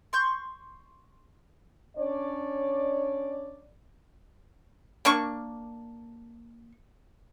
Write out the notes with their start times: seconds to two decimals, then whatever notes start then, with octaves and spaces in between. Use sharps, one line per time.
0.13 C6 C#6 G6
1.97 C#4 D4 C#5 D5
5.05 A#3 D4 C#6